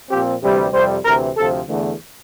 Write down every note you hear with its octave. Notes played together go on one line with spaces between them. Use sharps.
A#2 F3 C4 G4
D2 C3 E3 G3
F2 C3 G3 C5
D2 C3 E3 A#4
D2 C3 F3 A4
E2 D3 A3